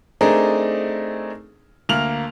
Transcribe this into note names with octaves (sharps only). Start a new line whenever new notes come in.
A3 C4 D4 D#4 G#4 A#4
D2 A#3 F6 F7 F#7